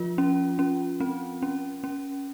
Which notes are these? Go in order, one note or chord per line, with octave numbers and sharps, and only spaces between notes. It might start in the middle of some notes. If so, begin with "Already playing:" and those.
Already playing: F3 F4
C#4
C#4
C4
C#4
C#4